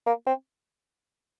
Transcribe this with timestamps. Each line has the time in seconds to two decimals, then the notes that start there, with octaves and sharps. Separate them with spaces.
0.06 A#3
0.27 C4